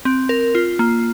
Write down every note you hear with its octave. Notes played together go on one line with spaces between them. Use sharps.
C4
A#4
F4
A#3